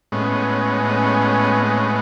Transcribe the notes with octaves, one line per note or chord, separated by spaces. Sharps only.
A2 G#3 B3 C#4
C#4
B3
C#4
B3